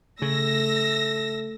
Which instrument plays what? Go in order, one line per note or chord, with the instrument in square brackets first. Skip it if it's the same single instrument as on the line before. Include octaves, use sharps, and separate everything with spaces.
[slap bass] C#3 [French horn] A3 [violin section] E6 A#6